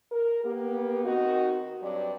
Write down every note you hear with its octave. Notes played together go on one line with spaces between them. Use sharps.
A#4
A#3 B3 G4
D#3 C4 D#4 F#4
G2 F#3 C4 D5